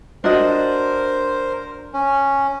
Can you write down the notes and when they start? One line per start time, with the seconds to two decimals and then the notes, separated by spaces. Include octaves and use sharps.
0.24 D4 F#4 A#4 C5 D#5
1.94 C#4